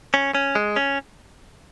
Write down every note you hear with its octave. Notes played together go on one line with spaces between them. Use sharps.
C#4
C#4
G#3
C#4